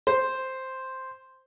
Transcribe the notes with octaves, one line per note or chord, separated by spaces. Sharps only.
C5